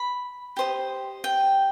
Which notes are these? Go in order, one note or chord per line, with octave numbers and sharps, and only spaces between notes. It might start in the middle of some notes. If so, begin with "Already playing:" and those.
Already playing: B5
G4 C5 D#5
G5